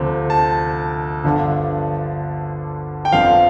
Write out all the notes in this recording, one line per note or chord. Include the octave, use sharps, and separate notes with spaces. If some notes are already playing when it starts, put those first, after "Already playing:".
Already playing: D2 C3 F3
A5
G1 G2 D3 F3
G5
G1 F2 D3 F3 F5